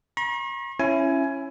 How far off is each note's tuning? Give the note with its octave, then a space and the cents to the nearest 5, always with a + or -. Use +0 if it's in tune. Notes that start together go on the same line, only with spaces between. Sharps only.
A#5 +45 C#6 -45
C#4 -15 E4 +15 G#5 +15